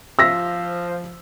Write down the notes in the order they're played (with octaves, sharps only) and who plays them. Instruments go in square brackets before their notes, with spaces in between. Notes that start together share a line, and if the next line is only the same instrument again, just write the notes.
[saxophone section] F3 [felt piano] E6 A#6 B6